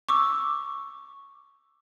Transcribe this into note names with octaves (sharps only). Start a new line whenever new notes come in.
C#6 D6 E6